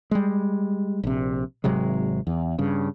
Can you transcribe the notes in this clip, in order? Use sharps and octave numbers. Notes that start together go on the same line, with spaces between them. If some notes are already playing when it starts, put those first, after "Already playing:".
G3 G#3
A#1 C3
G#1 C3 F#3 G#3
E2
G2 C#3